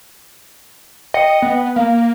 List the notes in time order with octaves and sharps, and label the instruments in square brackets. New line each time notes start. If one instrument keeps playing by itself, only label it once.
[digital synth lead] D#5 [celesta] G5 C#7
[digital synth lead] B3
[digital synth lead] A#3 [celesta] F5